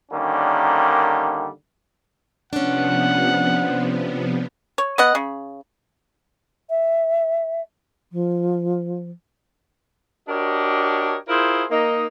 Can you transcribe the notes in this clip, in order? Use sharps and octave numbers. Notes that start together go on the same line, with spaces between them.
D3 D#3 G3 A#3 C#4
C3 F3 B3 C#4 D4 F#5
C#5
B3 D#5 F#5
C#3
E5
F3
D4 F#4 G4 A#4 C#5 D#5
E4 F4 G#4 A#4 C5
A#3 D#4 D#5